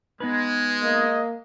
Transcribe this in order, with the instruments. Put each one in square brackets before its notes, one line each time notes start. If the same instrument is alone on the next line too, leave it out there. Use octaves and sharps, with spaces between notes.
[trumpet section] G#3 [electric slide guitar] B3 D#4 B4
[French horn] A#3 [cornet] D#5